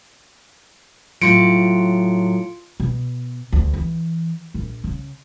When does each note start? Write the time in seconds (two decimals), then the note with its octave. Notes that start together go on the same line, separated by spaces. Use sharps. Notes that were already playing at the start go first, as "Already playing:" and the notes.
1.22 A2 F#3 F4 C#7 D7
2.80 B2
3.53 D2
3.73 E3
4.54 A#1
4.84 C#3